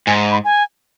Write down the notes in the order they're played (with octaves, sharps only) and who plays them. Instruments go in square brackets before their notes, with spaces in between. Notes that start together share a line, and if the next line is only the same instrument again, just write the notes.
[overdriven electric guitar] G#2 [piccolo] G#5
[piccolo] B5
G#5